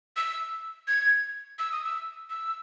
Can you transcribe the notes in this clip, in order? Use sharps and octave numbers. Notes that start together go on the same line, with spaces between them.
E6
G#6
E6
D#6
E6
E6